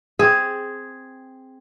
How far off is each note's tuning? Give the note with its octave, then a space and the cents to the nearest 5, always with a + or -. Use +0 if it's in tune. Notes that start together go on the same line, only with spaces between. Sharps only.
C4 +0 G#4 +0